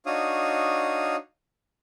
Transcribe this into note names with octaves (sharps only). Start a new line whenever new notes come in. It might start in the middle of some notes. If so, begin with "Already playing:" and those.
D4 D#4 F#4 C#5 F5 D#6